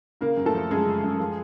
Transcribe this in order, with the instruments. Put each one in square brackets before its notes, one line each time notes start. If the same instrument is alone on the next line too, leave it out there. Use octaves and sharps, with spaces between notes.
[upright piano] C#3 A#3 A#4
F#2
A3 A4
F3
F#2 G#3 G#4
C#3
F#2
F3